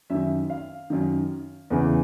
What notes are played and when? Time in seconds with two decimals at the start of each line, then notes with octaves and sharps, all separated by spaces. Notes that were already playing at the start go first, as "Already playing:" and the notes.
0.10 F#2 D#3 E5
0.50 F5
0.90 F#2 D#3
1.70 E2 C#3 E3